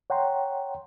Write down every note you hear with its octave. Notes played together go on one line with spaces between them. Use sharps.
C#5 F#5 G5 A#5 C6